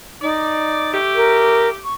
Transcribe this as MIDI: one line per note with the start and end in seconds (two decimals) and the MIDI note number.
0.22 0.98 63
0.22 0.87 74
0.93 1.81 57
0.93 1.81 67
1.15 1.68 70
1.84 1.94 85